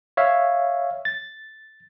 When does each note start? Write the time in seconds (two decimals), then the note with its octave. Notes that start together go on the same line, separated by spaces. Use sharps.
0.17 C#5 E5 F5
1.05 A6